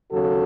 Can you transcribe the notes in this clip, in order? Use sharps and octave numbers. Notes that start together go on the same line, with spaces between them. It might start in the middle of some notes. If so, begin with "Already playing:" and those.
D#2 C#3 F#3 F#4 A4